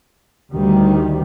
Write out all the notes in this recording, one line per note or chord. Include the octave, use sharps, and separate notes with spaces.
D2 D#3 G3